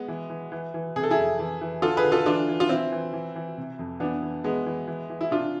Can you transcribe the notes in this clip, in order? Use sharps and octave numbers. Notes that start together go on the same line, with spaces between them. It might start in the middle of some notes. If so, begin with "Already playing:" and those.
Already playing: G#3 B3
E3
E3
E3
E3
C3 G#4
A4
E4 G#4
F2
E3
E3
D3 F4 A4
G#4 B4
D3
F4 A4
E3 D4 F4
E3
F4
E3 C4 E4
E3
E3
E3
C3
F2
E3 B3 D4
E3
E3 G#3 B3
E3
E3
E3
E4
C3 D4 F4